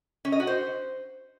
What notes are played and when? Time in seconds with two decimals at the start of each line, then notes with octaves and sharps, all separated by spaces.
0.25 C#4
0.32 D#5
0.40 F#4
0.47 C5